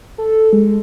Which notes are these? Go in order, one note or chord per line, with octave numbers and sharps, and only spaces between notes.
A4
G#3